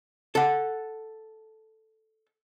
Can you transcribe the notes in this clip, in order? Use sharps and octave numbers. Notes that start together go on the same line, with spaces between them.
A4 F#5